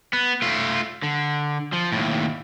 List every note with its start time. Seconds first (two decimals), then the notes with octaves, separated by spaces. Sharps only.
0.13 B3
0.42 A3 F4
1.03 D3
1.73 F3
1.92 D#2 A2